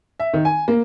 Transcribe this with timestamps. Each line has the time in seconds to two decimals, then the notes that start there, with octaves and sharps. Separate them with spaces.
0.20 E5
0.34 D#3
0.45 G#5
0.68 A#3